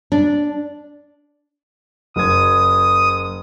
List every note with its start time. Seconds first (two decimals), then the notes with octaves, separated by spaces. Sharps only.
0.12 D4
2.16 F#1 D#6 G#6